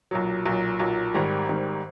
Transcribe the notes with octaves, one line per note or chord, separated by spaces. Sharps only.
B1 A#2 F#3
B1 A#2 F#3
B1 A#2 F#3
G#1 G#2 D#3 G3
G#1 G#2 D#3 G3